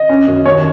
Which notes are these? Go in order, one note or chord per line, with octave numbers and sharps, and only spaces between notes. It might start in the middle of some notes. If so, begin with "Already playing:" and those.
Already playing: D#5
C#4
F#2
D#2 C#5